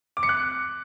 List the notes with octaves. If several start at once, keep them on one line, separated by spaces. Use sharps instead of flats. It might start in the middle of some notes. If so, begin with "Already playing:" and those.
D6
C#7
F#6